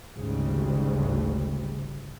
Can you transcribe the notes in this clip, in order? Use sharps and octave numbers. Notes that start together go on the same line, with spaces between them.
G#1 D2 G#2 C#3 G3